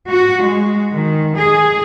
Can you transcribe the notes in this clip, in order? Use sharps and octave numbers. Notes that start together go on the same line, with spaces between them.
F#4
G#3
D#3
G#4